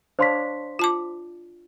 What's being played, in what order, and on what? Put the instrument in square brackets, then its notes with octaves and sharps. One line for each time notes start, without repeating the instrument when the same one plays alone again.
[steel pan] D4 C#5 F5 [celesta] C5 C6 B6
[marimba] F4 A5 D6